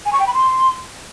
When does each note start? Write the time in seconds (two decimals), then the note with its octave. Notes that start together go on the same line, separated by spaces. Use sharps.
0.06 G#5
0.13 C#6
0.20 G5
0.27 B5
0.34 C6